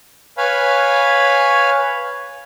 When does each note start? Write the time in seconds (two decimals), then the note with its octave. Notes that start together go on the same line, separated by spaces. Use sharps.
0.37 B4 C#5 F5 G#5 B5